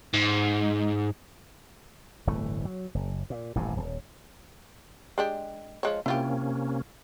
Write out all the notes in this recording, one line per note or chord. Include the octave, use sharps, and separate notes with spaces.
G#2
D1 G1 E3 A3
F#3
F#1
A#2
D#1 A1 G2 C3
D#1
G#3 D4 G4
F3 G#3 C#5
C3 A#3 C#4 E4 F4 G4